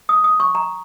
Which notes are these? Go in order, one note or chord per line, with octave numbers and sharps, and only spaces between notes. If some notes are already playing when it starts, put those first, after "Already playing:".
D#6
D#6
C#6
A#5